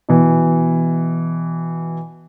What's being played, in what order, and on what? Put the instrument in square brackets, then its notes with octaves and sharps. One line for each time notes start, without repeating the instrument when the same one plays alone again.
[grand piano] B2 E3